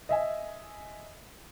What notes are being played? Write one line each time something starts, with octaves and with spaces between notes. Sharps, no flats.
D#5 E5 G#5